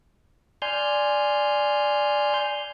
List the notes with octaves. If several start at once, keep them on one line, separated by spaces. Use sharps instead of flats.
D5 G#5 C6 F6 G6